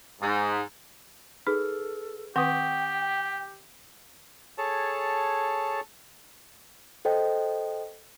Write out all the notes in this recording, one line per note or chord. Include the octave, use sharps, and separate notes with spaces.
G#2
D#4 G#4 A4 B4 F6
D#3 C4 G4 B4 F#5 G5 C#6 D#6
G#4 A4 C#5 A5
A4 C5 D#5 G5